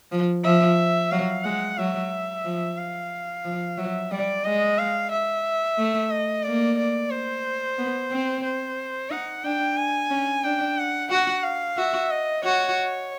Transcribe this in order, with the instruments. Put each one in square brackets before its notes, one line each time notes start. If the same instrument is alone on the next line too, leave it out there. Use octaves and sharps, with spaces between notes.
[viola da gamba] F3
[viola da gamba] F3 [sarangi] E5
[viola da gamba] F#3 [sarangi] F5
[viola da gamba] G#3 [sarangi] F#5
[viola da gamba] F#3 [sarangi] E5
[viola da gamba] F3
[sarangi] F5
[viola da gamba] F3
[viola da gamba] F#3 [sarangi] E5
[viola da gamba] G3 [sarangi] D5
[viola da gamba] G#3 [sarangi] D#5
[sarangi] F5
E5
[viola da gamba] A3
[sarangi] D#5
[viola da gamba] A#3 [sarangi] D5
[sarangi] D5
C5
[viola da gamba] B3
C4
[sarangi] C5
[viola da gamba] D#4 [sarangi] F#5
[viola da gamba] D4 [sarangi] G5
[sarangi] G#5
[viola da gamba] C#4
[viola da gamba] D4 [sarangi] G5
[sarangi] F#5
[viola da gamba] F#4 [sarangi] F#5
[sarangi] F5
[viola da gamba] F#4 [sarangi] E5
[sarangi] D#5
[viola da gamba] F#4 [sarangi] C#5